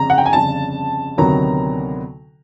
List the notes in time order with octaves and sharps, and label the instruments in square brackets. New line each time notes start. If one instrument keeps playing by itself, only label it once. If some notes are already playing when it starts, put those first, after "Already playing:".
Already playing: [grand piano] G1 F2 C#3 [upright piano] A#5
[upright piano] F#5
G5
G#5
[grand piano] G1 F2 C#3 [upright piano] A5
[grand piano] D2 C3 D#3 F#3 B3 [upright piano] A#5